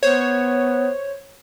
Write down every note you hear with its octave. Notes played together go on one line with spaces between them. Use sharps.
B3 C5 C#5